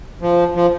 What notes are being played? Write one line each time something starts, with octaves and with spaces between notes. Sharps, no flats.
F3
F3